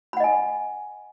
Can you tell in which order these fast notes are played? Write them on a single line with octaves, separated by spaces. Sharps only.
B5 F#5 D#5 G#5